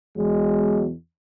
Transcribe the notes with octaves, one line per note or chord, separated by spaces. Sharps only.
E2 B2 F#3 G#3